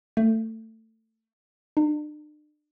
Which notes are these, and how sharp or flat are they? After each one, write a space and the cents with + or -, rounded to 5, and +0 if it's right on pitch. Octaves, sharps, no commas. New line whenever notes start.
A3 +20
D4 +40